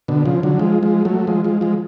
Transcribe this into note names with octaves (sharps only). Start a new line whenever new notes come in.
B2 D3
C#3 F3
D3 F#3
F3 G#3
F3 G#3
F#3 A3
F3 G#3
F3 G#3
F3 G#3